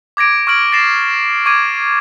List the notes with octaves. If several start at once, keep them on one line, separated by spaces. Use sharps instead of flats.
D6 G#6 A#6 D7
C#6 D#6 F6 G#6 D7 F#7
A6 A#6 C7 E7
C#6 D6 G#6 D#7